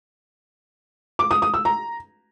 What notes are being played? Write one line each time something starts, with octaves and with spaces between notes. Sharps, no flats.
D6
D#6
D#6
E6
A#5